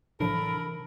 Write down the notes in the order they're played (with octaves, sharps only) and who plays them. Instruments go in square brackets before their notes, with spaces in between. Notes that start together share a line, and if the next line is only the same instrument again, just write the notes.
[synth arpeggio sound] A2 F3 D4 [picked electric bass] C3 E3 [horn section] A4 A#4 [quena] B5